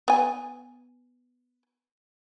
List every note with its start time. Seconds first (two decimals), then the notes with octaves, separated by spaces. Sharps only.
0.08 B3 G#5